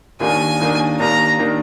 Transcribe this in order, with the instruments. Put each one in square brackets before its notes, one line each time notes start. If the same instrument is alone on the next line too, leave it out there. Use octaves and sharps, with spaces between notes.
[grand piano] D#2 D#3 A#3 D4 [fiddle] G#5
[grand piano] D#2 D#3 A#3 D4
[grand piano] D#2 D#3 A#3 D4 [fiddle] A#5
[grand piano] D#3 A#3 D4